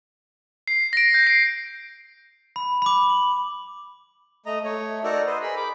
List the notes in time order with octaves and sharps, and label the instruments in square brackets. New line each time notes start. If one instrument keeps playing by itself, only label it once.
[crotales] C7
A#6 D7
G6
C7
[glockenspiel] B5
B5 D6
F#7
[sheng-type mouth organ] A3 D#5 A#5
A3 C#5
D#4 F#4 A4 A#4 D5
B4 C5 D#5
G#4 A#4 B5
B5 D6